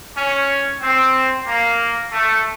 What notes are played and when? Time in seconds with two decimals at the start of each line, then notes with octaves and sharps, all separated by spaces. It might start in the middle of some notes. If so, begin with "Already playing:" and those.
0.15 C#4
0.81 C4
1.47 A#3
2.11 A3